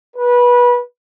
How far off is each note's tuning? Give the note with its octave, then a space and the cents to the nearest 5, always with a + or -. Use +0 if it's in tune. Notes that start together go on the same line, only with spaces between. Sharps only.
B4 -20